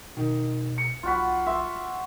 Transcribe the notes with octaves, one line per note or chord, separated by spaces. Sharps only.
B2 D#3
C#7
B1 F4 F#4 B5
E5 C6